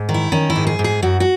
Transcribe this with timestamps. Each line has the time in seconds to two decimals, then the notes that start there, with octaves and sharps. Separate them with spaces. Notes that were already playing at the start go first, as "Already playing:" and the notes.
Already playing: G#2
0.09 D#3
0.14 E4
0.32 D#3 C#4
0.50 E4
0.56 G#2
0.67 G#4
0.79 G#2
0.84 G#4
1.02 F#2 F#4
1.20 F#4